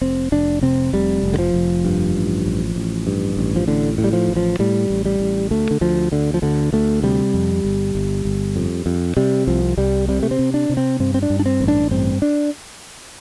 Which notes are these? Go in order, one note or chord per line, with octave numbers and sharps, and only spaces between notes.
F1 C4
F1 D4
C3 C4
F1 G3
F1
D3
F3
F1
G2
A1
A1
A1
G2
A1
F3
A2 D3
A2
G3
F3
A1
F3
A2 G3
A1
G3
A1
D2 A3
D3
D2 F3
D2 D3
F3
D2 D3
D2 A3
C3 G3
F2
G1
G1
G1
F2
F2
C3 G3
C2 F3
C2 G3
C3 G3
A3
C4
C3
D4
C3
C4
G2 C4
C4
D4
G2
D4
C4
A1
D4
G2 C4
D4